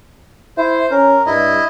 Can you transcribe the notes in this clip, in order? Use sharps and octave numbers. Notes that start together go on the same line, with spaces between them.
E4 C5
C#4 A#4
G2 E4 D#5